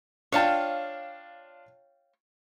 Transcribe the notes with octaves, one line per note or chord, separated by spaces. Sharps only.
D4 F4 C#5 F5 G5 A5